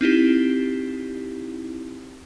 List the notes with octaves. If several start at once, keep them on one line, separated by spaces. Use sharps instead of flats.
C4 D#4 E4 G4